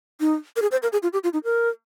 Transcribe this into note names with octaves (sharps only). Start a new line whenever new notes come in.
D#4
A#4
G#4
C5
A#4
G#4
F4
G4
F4
D#4
A#4